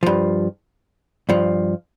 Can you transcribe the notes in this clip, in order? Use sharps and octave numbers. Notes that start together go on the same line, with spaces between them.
G2 F3
G2 F3